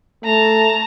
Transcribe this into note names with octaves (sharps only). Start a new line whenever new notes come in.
A3 A5 A#5